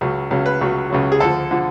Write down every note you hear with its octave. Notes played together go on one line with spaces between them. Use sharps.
C#2 C#3 F#3
C#2 C#3 F#3
B4
C#2 C#3 F#3
C#2 C#3 F#3
G#4
D2 D3 F3 A4
D3 F3